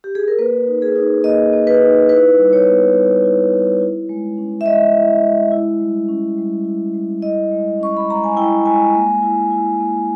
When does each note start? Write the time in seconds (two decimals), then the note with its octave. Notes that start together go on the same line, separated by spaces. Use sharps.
0.04 G4
0.15 G#4
0.28 A#4
0.39 A#3 B4
0.67 D#4
0.82 G#4
0.95 D#4
1.24 A#3 D#5
1.53 A#3
1.67 B4
1.81 D#4
2.09 E4 B4
2.38 G3
2.53 C#5
2.67 B3
2.95 G3
3.24 E4
3.52 G3
3.81 E4
4.09 G#3
4.38 C#4
4.61 E5
4.66 G#3 D#5
4.95 E4
5.23 G#3
5.52 E4
5.81 G3
6.08 C#4
6.38 G3
6.65 E4
6.94 G3
7.22 E4 D#5
7.51 G#3
7.80 C#4 C#6
7.97 B5
8.08 G#3 A#5
8.24 G#5
8.36 E4 G5
8.66 G#3 G#5
8.94 A#3
9.22 E4
9.51 E4
9.80 A#3